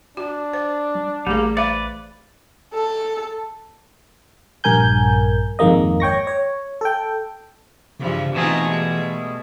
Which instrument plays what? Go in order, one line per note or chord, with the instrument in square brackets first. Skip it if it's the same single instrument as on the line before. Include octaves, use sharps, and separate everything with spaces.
[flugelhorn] D4 [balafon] F#4
[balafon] C5
[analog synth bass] G3
[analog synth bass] A1 [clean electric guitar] G3 A#3 [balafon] A3 G#4
[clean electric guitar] B4 D5 [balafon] C5 E5 F5
[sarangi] A4
[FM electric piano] A#1 G2 A#4 G#5 G6
G#1 F2 D#3 G#3 A#3 D#5
C#5 G5 C#6 A#6
C#5
A4 G5
[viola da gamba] G2 E3 F3 [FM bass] C#3
[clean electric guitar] B2 A3 G#4 [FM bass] E3 [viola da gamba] C4 D#4 F4
[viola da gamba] G3 G#3